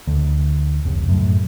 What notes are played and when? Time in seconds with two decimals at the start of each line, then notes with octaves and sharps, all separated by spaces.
0.07 D2
0.85 F1 C#2
1.09 F#2 A2